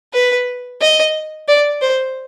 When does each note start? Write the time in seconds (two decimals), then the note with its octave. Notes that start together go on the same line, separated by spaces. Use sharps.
0.14 B4
0.81 D#5
1.48 D5
1.82 C5